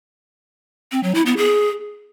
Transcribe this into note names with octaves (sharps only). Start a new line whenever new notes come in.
C4
F#3
E4
B3
G#4